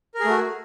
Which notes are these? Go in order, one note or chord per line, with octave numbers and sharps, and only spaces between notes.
A3 F#4 G#4 A#4